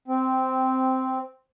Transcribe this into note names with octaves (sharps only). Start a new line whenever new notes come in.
C4